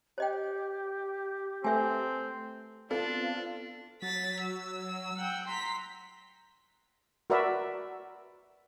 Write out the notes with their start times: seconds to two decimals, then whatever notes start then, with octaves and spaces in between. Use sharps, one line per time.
0.18 G4 C5 D#5 G5
1.64 A3 C4 A4 B4 E5 G#5 G6
2.91 B3 C4 D4 F4 A4 F5
4.02 F#3 A6 B6
4.41 E6
5.17 F#5 G5
5.48 A#5 C6 B6
7.30 F#4 A#4 B4 D5 E5